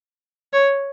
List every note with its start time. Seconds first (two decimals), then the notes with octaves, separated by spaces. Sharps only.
0.53 C#5